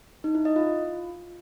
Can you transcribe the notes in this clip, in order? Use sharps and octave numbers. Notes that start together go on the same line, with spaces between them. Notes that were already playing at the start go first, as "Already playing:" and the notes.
D#4
E4
D#5
F4